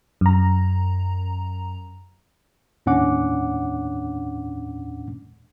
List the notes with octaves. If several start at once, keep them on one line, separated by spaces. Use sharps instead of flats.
F#2 A#5
D#2 A2 C#4 D4 F#5 D6